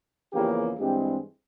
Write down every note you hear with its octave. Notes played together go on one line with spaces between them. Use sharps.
E2 C#3 F3 A#3 G4
G2 E3 G#3 C4 G4